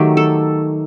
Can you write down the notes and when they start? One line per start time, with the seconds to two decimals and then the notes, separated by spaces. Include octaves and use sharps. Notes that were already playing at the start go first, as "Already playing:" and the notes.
Already playing: D#3 F#3 A3 G4
0.17 A4